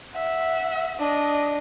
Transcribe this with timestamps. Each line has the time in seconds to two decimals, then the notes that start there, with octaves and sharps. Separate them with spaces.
0.12 E5 F#5
0.99 D4 D#5